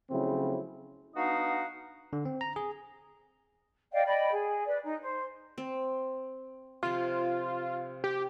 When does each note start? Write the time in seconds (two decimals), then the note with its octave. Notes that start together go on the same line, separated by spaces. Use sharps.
0.11 C#3 F3 F#3 A3 C4 E4
1.16 B3 D4 D#4 F#4 D#5 F5
2.13 D3
2.25 C4
2.41 A#5
2.56 G#4
3.92 D5 D#5 F5 G5
4.05 D5 D#5 G5 B5
4.31 G#4
4.66 B4 D5
4.83 D#4
5.01 C5
5.58 C4
6.83 C3 F3 F4
8.04 G4